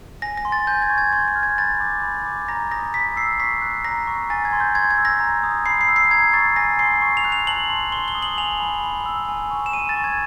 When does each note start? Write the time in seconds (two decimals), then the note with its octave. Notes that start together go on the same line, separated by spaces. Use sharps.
0.22 G#5 A#6
0.37 A#6
0.45 C6
0.52 A6
0.67 G#5 G6
0.82 G#6
0.90 C#6
0.98 G#6
1.13 C6 G#6
1.28 G#6
1.36 F6
1.43 G#6
1.58 B5 A6
1.81 D6
2.03 B5
2.26 D6
2.48 A#5 A#6
2.71 D#6 A#6
2.94 B5 B6
3.16 E6 C7
3.39 C#6 B6
3.62 F#6
3.84 A#5 A#6
4.07 C#6
4.30 G#5 A6
4.45 G#6
4.53 C6
4.60 G6
4.75 C6 G#6
4.90 G#6
4.98 E6
5.05 A#6
5.20 A#5
5.43 D#6
5.66 B5 C7
5.81 C7
5.88 E6
5.96 C7
6.11 A#5 G#6
6.33 C#6 A6
6.56 G#5 A#6
6.79 C6 C7
7.02 C#6
7.17 F7
7.25 F#6
7.32 F7
7.47 A5 F#7
7.70 C6
7.92 C6 G7
8.08 G7
8.15 D#6
8.22 F#7
8.38 G#5 F7
8.60 B5
8.83 B5
9.06 E6
9.28 G#5
9.51 C#6
9.66 E7
9.73 G#5 D#7
9.89 A6
9.96 C#6
10.04 G#6